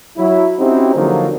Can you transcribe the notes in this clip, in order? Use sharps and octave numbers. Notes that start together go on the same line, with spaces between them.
F#3 E4
C4 C#4 D#4 E4 F#4 G4
D3 F3 F#3 A#3 D#4 F4